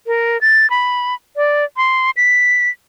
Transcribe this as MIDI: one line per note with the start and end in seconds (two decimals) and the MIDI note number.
0.07 0.40 70
0.41 0.69 93
0.70 1.14 83
1.36 1.64 74
1.77 2.11 84
2.17 2.70 95